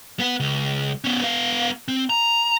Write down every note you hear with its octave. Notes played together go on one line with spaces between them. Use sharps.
B3 F#5
C#2
B3 C#4
B3 F5
C4
A#5